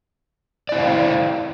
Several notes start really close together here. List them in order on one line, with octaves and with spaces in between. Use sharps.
D5 E4 C5 F5